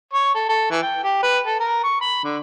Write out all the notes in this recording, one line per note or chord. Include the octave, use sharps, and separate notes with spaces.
C#5
A4
A4
E3
G5
G4
B4
A4
A#4
C#6
B5
D3